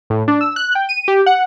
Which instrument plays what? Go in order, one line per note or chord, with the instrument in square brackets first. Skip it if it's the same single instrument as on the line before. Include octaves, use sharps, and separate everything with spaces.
[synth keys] A2
D4
E6
F#6
G5
D#7
G4
F#5